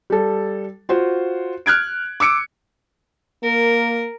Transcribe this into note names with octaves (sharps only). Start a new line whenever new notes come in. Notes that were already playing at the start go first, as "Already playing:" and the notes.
G3 A4
F4 F#4 C5
F6 F#6 G#6 D7
D6 E6 C#7 D7
A#3 A#4